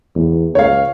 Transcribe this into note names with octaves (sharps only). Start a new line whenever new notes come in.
E2
C#2 C#5 F5